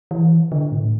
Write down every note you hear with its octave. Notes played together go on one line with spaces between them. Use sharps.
E3
D3
A2